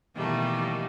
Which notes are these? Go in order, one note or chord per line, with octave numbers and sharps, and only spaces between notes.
B2 D#3 E3 G3 A3 A#3